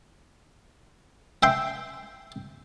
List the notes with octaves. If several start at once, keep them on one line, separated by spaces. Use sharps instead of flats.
E5 G5 C6